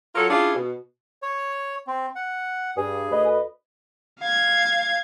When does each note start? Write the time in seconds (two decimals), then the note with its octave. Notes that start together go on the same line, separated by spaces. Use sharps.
0.15 F#3 F4 F#4 A4 A#4 C#5
0.30 C#4 D4 E4 F4 G4 G#4
0.55 B2
1.23 C#5
1.87 C4
2.16 F#5
2.77 G2 G#4
3.11 D2 B4 D#5
4.20 F5 G#6